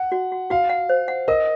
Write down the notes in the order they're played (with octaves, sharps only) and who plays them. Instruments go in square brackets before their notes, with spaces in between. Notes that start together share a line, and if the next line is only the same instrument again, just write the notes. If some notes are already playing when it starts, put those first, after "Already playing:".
Already playing: [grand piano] F#5
[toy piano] F#4
F#4
[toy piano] F#4 [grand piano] F5
[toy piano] F#5
C5
F#5
[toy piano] A#4 [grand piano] D#5